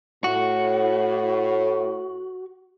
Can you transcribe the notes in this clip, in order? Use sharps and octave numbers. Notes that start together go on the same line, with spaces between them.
A2 F#4